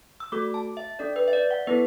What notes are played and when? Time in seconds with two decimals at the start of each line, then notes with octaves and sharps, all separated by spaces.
0.20 E6
0.32 A3 F#4 A4 D6
0.54 A5
0.77 E5
0.99 D4 A4 D5
1.16 B4
1.28 E5
1.33 D5
1.51 F#5
1.67 B3 E4 A4 B4